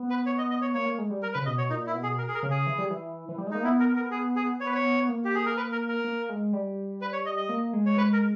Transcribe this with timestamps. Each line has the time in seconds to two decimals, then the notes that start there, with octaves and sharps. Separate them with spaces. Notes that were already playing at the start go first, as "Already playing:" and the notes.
Already playing: B3
0.10 B4
0.26 C#5
0.38 D#5
0.50 D#5
0.62 C#5
0.74 A#3 C#5
0.86 A#3
0.98 G#3
1.10 G3
1.23 A#4
1.34 C#3 B4
1.46 B2 D#5
1.58 C#5
1.70 A#2 D#4
1.87 E4
1.95 B2
2.03 G#4
2.18 A#4
2.28 G#4
2.34 A#4
2.43 C#3
2.51 G#4
2.67 E3
2.78 G3
2.91 E3
3.29 E3
3.38 G3
3.47 G#3
3.51 A#3 D#4
3.63 B3 E4
3.80 A#4
3.96 A#4
4.11 G#4
4.36 G#4
4.60 C#5
4.67 B4
4.75 C#5
5.09 A#3
5.25 G4
5.35 G#4
5.46 A#4
5.57 B4
5.72 A#4
5.88 A#4
6.04 A#3
6.29 G#3
6.53 G3
7.01 B4
7.13 C#5
7.26 D#5
7.37 D#5
7.49 A#3
7.73 G#3
7.86 C#5
7.97 G#3 B4
8.13 A#4